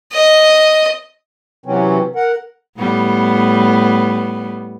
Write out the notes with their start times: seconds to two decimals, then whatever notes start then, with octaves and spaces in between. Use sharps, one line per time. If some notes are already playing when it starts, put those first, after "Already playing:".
0.13 D#5
1.66 C3 E3 F#3 C4 C#4
2.15 A#4 F#5
2.77 A2 G3 B3